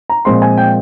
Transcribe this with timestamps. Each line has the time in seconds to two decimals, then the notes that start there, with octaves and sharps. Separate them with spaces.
0.10 A#5
0.25 A#2 F3 G#3 C4 C6
0.42 G#5
0.58 G5